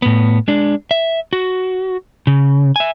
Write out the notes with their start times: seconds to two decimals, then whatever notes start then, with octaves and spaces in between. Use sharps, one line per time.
0.02 A2 B3
0.48 G#3 D4
0.91 E5
1.33 F#4
2.27 C#3
2.76 E5 G#5